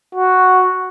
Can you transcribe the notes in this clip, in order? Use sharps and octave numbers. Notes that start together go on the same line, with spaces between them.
F#4